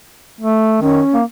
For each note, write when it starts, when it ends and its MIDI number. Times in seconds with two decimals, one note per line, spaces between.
0.41 0.81 57
0.81 1.01 51
0.81 1.15 61
1.14 1.23 58